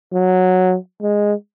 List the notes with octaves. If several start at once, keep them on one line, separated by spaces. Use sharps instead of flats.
F#3
G#3